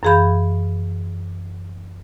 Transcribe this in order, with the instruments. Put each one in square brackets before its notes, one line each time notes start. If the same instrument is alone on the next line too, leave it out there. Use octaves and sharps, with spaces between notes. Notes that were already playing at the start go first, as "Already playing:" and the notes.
[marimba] F#2 E3 G#4 F5 B5 G6